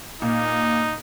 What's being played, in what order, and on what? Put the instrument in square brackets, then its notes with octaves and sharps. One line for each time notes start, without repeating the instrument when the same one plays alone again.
[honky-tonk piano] A#2 [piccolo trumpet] D#4